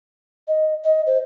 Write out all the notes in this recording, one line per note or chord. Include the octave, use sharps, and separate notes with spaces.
D#5
D#5
C5